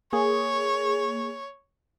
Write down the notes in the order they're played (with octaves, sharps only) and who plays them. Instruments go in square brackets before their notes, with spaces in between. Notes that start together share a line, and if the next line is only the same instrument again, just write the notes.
[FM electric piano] A#3 G#4 [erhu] C#5